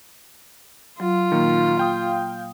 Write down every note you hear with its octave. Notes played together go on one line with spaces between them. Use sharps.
F#3 F4
A#2 D#3 A#3
F5 G5 D#6